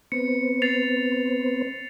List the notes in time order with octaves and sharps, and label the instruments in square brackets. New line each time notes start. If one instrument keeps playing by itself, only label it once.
[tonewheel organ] B3 C4 [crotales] C#7
[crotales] A6 C7 F7